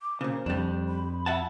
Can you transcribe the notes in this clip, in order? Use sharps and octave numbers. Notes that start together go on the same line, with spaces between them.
D6
A#2 C#3 C5
F2 G3 D4
B5
E5 F#5 A5